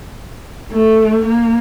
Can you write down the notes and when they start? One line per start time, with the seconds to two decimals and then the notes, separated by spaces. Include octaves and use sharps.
0.73 A3
1.26 A#3